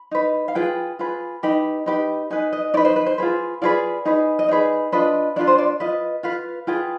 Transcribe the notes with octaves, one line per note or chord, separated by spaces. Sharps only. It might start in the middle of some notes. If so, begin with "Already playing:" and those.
Already playing: B5
D#4 B4
F5
F4 G#4 B4 G5
F4 G#4 B4
D#4 G4 B4 B5
D#4 G4 B4
D#4 B4 G#5
D#5
D#4 B4 D5
C5
B4
C5
F4 G#4 B4
F4 G#4 B4 D5
D#4 G#4 B4
D#5
D#4 G#4 B4 D5
D4 F4 B4 D#5
D4 F4 B4 D5
C5
D5
F4 B4 D#5
F4 B4 F5
F4 G#4 B4 G5